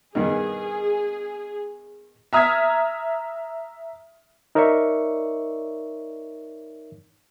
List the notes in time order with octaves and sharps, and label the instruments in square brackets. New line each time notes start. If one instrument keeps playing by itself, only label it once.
[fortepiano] G2 B2 D#3 [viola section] G#4
[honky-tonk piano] E5 A#5 D#6 F6 G#6 B6
[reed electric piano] D#4 A#4 C#5 D5 E5 C#6